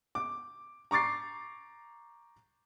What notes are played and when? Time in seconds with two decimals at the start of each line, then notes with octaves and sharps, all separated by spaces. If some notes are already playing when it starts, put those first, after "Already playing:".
0.15 D6
0.91 A#5 C#6 D6 A6 C7